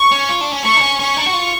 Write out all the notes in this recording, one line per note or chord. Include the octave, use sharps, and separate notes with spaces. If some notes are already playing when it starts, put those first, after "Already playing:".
Already playing: C#6
C#4
F4
D4
C#4
A3 C#6
D4
C#4
C#4 C#6
D4
F#4
F4